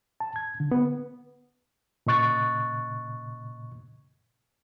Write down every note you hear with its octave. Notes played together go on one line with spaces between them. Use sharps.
A5
G#6
D3
B3
A#2 C#3 D#5 C#6 F#6 A6